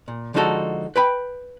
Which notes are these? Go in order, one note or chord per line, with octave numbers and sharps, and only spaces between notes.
A#2
D3 F3 G#3 D#4 F#4 A4
B4 G5 B5